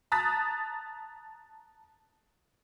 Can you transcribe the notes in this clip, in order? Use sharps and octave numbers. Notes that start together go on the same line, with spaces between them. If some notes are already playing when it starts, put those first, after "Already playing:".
A5 A#5 D#6 F#6 A6 B6